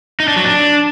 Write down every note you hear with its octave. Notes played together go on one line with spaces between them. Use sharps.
D#4
D4
F#3
D4